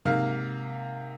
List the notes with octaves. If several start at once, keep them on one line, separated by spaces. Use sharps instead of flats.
G#2 C3 A#3 F5 F6